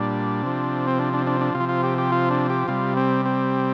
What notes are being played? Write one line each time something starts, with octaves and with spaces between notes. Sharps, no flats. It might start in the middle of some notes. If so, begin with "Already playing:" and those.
Already playing: A#2 G3 D4
C3 F3
C4
D4
D4
D4
D4
C3 F4
F3
F4
G4
G4
F4
D4
G4
C3 G3 F4
C4
C4